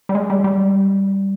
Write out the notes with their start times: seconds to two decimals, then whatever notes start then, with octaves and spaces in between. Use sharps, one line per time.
0.09 G3
0.15 G#3
0.30 G3
0.44 G3